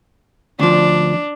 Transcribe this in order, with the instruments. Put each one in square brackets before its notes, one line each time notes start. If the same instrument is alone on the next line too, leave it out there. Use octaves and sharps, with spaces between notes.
[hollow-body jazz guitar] D2 F3 [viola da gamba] D4